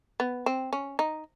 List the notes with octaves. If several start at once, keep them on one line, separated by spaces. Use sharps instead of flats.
B3
C4
C#4
D#4